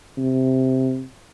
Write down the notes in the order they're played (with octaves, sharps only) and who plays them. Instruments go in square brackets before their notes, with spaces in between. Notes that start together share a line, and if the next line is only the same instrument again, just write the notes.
[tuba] C3